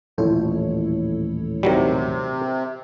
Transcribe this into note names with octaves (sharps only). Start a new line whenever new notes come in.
D#1 A1 F3 E4 A4 C#5
C3 D#3 F#3 G3